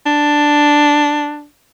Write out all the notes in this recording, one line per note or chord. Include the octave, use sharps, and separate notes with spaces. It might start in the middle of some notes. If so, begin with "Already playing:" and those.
D4